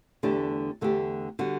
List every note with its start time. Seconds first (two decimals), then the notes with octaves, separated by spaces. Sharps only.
0.23 E2 D3 A3 D4 G4
0.81 E2 D3 A3 D4 G4
1.39 D3 G3 B3 F#4